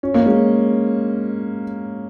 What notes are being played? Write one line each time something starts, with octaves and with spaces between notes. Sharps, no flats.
C#4
A#3
G#3 C#4